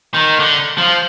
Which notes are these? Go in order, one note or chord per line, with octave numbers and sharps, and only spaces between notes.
D#3
D3
F3